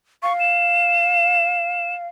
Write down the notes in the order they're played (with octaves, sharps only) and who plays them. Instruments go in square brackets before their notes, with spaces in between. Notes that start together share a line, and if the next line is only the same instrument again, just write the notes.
[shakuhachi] F5 [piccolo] C#6
[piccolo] E7